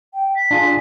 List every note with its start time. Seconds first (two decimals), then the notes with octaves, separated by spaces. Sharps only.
0.14 G5
0.36 B6
0.51 D4 F4 G#4